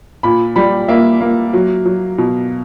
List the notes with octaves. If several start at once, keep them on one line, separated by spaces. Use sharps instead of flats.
A#2 B5
G3 B5
A#3 E5
A#3
F#3
F#3
B2